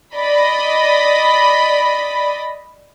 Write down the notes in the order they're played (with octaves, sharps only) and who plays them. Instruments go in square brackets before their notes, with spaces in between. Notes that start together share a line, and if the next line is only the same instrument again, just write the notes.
[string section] D5 D#5 B5